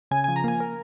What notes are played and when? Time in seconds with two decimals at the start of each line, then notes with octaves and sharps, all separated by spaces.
0.11 C#3 G#5
0.24 F3 G#5
0.36 A#5
0.44 A#3 G#5
0.60 A#4